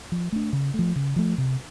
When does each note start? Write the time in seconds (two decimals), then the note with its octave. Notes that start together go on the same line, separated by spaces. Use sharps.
0.12 F3
0.32 A3 D4
0.53 C#3
0.74 F3 A3
0.96 C#3
1.16 F3 A3
1.38 C3